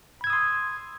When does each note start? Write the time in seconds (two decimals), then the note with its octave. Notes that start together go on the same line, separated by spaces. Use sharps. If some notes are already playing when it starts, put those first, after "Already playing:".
0.21 B5
0.24 G#6
0.27 E6
0.30 D#6
0.33 C6